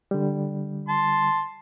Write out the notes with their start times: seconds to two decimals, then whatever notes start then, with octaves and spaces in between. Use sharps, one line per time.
0.11 D3 G3
0.89 A5 C6